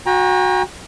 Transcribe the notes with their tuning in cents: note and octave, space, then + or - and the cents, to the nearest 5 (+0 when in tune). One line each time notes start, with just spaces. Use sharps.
F#4 -15 G5 +40 A#5 +25